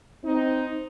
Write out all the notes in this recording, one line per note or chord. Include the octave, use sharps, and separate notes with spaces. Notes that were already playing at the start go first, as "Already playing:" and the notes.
C4 D#4